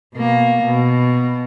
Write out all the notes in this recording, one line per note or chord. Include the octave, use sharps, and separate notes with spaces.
B2 A#3
B2